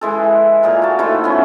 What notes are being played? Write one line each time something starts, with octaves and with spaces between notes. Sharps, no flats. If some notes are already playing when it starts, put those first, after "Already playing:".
E3 G#3 A4
A#2 G#4 A#4 F5
F#4 A5
D#3 F3 A3 E4
B3 C#4